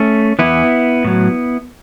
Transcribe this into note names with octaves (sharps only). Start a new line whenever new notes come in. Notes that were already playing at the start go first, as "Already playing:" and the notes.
Already playing: A3 C#4
E2 E3 B3 E4
A2 F#3